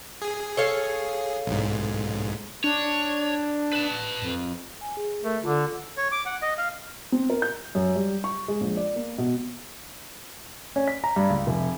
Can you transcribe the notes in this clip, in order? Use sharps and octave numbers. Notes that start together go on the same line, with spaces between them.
G#4
A4 C#5 F5
B1 G#2
D4 C#5
B4 A5
F2
G#5
G#4
A3 A#4
D3 F4 A5 D6
C#5
D6
F#5
D#5
F5
C4
A#4
G6
F#2
G3
C#6
G#3
A#1
D5
A#3
B2
C#4
B6
A#5
G2
C#2
F1